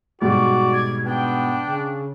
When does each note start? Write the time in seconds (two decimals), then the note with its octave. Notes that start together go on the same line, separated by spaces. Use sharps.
0.21 G#2 B2 G3 F#4 D5
0.73 G#6
1.05 B3 D4 G5
1.66 C#3